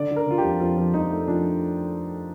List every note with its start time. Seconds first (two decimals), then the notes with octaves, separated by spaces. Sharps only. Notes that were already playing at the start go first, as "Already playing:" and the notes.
Already playing: D3 D5
0.10 D3
0.16 A#4
0.27 D3 F4
0.38 G4
0.44 F2
0.60 F2 F4
0.77 F3
0.94 F2 D#4
1.11 A3
1.28 F3 D4